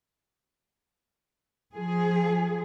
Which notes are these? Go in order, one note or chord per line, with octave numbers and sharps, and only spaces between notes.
F3 G#4